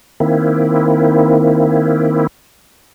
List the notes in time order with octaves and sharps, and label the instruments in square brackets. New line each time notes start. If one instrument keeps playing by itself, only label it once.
[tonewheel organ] D#3 A#3 C4 E4